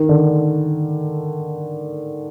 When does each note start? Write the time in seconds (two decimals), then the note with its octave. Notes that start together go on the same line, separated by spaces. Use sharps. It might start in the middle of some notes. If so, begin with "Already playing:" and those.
Already playing: D#3
0.09 D3